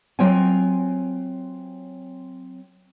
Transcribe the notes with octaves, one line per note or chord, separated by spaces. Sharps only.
F#3 C4 F4 C#5 G5 G#5